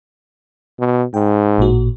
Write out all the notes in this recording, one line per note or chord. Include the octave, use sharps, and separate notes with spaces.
B2
G#2 G5
A1 A#2 F#4